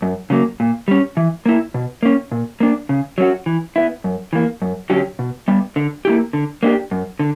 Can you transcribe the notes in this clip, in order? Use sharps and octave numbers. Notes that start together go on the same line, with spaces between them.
F#2
C#3 F#3 A#3
A#2
G3 C#4
E3
A#3 E4
B2
A#3 C#4
A#2
A#3 D4
C#3
F#3 C#4 F#4
E3
B3 E4
F#2
E3 A#3
F#2
D3 F#3 C#4 G4
B2
G3 B3
D3
A#3 E4 G4
D3
A#3 D4 G4
F#2
D3